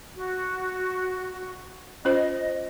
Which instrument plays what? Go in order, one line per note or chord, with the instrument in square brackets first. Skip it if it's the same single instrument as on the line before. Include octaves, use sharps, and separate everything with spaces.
[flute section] F#4
[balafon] C#4 F4 C5 [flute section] D#5